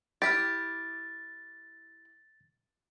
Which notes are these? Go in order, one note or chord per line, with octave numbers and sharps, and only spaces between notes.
E4 G4 F6 A6 B6 D7